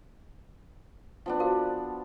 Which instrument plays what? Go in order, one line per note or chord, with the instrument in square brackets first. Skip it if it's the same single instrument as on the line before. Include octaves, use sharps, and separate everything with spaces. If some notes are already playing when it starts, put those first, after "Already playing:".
[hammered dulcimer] F3 B3 D4
[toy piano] F#4 A#4 F5